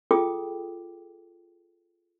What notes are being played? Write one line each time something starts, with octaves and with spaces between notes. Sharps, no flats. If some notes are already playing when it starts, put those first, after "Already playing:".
F4 G#4 A4 G5 D6 D#6